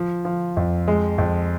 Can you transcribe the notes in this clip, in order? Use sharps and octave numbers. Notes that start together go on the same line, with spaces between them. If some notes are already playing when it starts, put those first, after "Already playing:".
Already playing: F3
F3
F2
G#3
F2